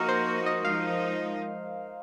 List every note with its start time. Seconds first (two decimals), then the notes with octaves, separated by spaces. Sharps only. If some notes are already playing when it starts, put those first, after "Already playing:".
Already playing: F3 A#3 D#4 F#4 A#4
0.08 C5
0.46 D#5
0.65 F3 G#3 D#4 F5